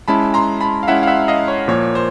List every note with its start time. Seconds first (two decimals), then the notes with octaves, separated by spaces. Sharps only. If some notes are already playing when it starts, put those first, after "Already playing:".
0.08 G#3 C#4 E4 A5 B5
0.34 A#5 C6
0.61 A5 B5
0.83 F5
0.88 G#3 C#4 E4 E5 F#5
1.03 F5
1.07 E5 F#5
1.28 D#5 F5
1.48 C#5
1.68 A#2 F3 A#3 C#5
1.95 C5